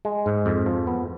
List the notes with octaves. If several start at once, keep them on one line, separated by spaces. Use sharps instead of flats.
G#3
G#2
F2
F3
B3